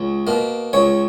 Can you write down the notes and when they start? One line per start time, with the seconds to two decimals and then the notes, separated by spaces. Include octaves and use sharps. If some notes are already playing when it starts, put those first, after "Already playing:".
Already playing: C#2
0.27 B2 A#3
0.73 C#2 C#5